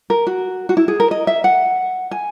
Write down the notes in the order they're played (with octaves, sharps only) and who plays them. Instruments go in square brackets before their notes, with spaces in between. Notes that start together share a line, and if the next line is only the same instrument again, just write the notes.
[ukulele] A#4
F#4
F#4
E4
G#4
A#4
D#5
E5
F#5
G#5